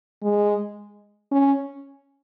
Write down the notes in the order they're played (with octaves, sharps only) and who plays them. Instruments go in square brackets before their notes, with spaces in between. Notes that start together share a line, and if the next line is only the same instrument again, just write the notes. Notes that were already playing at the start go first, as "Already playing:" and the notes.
[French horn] G#3
C#4